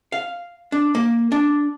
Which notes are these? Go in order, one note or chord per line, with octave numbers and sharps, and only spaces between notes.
F5
D4
A#3
D4